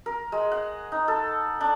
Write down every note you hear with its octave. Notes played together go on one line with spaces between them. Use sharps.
A#4
G#3
F#5
D#4
A4
D4